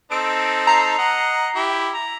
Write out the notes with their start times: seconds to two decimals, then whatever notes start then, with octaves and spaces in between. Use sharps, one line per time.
0.12 C4 D#4 A4 D7
0.67 A#5 C7
0.98 D#5 F#5
1.56 E4 G4
1.94 A#5